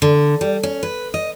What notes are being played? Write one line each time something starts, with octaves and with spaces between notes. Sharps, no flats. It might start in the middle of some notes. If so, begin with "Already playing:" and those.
D3
G3
C#4
B4
D#5